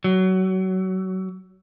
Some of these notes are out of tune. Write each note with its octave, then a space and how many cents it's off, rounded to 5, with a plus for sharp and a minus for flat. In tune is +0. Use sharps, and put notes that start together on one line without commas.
F#3 +25